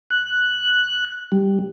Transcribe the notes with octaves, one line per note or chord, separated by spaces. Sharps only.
F#6
G3